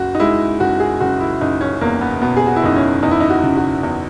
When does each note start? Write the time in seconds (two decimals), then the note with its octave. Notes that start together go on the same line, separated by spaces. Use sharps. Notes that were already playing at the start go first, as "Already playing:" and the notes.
Already playing: F#1 F#4
0.15 D#4
0.20 G#3 E4
0.60 F#1 F#4
0.80 G#4
1.00 F#1 F#4
1.20 E4
1.41 F#1 D#4
1.61 C#4
1.81 E2 A#3
2.01 B3
2.22 B2 B3
2.37 G#4
2.46 F#4
2.56 E4
2.63 F#1 D#4
2.76 C#4
3.02 E2 D#4
3.11 E4
3.20 D#4
3.30 F#4
3.43 C#3
3.57 F#4
3.83 E2